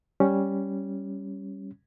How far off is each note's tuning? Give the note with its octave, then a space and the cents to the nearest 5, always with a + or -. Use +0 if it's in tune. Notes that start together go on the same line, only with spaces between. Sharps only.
G3 +0 C#4 +0